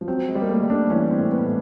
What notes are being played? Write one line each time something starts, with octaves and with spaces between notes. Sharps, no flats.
F3
F#3 C4
G#3
G3
A#3
A3
G3
D4
E3 C#4
C4
A2
B3
A2